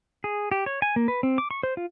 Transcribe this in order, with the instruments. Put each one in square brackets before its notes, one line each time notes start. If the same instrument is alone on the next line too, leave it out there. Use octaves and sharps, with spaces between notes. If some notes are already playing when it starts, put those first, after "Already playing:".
[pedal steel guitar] G#4
G4
C#5
G#5
A#3
B4
C4
D6
C#6
C5
F4